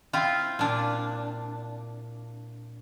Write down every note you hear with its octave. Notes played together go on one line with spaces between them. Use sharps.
C4 E4 F4
A#2 D4